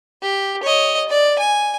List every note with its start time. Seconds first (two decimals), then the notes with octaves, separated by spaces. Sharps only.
0.22 G4
0.63 C#5 D#5
1.08 D5
1.39 G#5